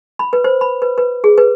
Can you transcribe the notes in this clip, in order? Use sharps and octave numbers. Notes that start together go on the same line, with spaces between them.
B5
B4
C5
B5
B4
B4
G#4
B4